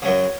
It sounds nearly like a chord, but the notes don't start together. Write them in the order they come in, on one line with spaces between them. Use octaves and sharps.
C#3 F#3 F#2